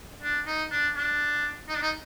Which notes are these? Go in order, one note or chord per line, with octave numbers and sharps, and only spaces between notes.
D4
D#4
D4
D4
D#4
D4
D#4